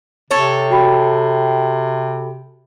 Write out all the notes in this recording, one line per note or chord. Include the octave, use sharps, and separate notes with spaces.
C3 A4 C#5
F#4 G5 B5